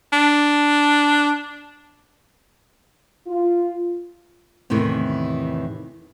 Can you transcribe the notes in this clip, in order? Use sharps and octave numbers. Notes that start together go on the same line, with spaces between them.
D4
F4
E2 A2 C3 D#3 E3